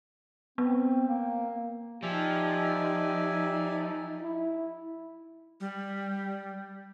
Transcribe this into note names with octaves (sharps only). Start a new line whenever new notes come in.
B3 C4
A#3
F3 D#4 G4 D5 E5 G#5
E4
G3